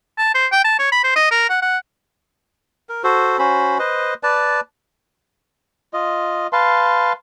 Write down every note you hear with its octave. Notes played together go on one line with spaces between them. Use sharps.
A5
C5
G5
A5
C#5
B5
C5
D#5
A#4
F#5
F#5
A#4
F#4 A4 C5
C#4 F#4 C5 B5
B4 C5 D#5
B4 D5 A5
F4 D#5
B4 F5 A5 C6